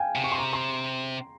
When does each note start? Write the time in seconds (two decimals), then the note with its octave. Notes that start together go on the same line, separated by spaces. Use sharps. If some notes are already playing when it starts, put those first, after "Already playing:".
Already playing: F5 G5 G#5
0.15 C3
0.24 C#6
0.32 C6
0.38 A#5
0.53 C6